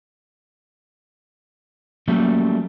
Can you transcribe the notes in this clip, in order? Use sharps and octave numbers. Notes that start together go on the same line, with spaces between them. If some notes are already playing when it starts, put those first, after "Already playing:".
F#3 G3 A3 A#3 C#4